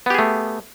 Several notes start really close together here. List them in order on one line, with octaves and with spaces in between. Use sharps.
B3 G4 G#4 A3